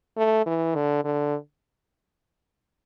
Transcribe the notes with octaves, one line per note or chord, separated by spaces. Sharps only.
A3
E3
D3
D3